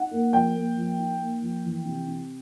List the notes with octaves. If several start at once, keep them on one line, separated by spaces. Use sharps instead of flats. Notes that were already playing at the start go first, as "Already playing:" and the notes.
Already playing: D#4 F#5
A#3
F3 G5
A#3
F3
D#4
A#3
F3
E3
C3
C3